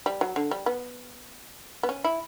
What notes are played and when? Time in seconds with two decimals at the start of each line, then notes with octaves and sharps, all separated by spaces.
0.06 G3
0.21 F#3
0.36 D3
0.51 G3
0.66 B3
1.83 B3
1.89 C#4
2.04 E4